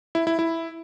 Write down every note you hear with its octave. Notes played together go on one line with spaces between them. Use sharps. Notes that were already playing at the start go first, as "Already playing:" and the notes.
E4
E4
E4